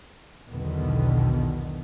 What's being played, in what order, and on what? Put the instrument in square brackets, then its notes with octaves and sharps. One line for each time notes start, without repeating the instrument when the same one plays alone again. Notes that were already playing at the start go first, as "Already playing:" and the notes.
[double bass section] B1 E2 B2 D3 D#3 B3